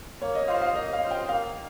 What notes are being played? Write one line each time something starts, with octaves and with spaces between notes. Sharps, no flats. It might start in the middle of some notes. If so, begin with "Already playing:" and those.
A#3 C#5
D#5
F4 C5 D#5 F5
F5
A#3 D#5
F5
F4 C5 D#5
G5
A#3 F5